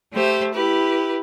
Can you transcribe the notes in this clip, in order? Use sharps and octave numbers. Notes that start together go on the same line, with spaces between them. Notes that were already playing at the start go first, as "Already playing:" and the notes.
A3 G4 C5 E5
E4 G4 B4